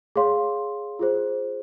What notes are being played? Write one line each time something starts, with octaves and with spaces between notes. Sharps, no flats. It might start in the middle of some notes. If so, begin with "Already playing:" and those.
G#4 C#5 F5 C6
F4 G#4 C5